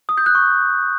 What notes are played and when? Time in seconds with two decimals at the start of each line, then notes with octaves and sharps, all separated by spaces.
0.09 D#6
0.18 G6
0.26 F#6
0.35 C#6